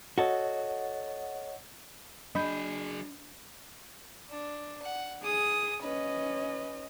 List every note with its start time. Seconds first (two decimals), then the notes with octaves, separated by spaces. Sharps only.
0.18 F#4 A4 C#5 D#5 F#5
2.35 F#3 D4 G#4 D#5 B5 G6
4.30 D4
4.82 F#5
5.23 G#4 D#6
5.82 C#4 B4 D#5